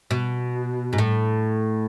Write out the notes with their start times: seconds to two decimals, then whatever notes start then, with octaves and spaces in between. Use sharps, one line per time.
0.11 B2
0.93 G#2
0.98 A2